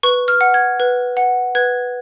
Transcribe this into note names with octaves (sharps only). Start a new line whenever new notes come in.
B4 C#6
F6
F#5
G#6
B4
F#5
B4 G#6